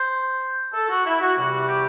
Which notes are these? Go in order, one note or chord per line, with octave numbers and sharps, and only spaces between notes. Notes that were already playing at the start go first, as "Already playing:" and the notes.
Already playing: C5
A4
F#4
E4
F#4
E2 C3 G3 F#4
F#4
G4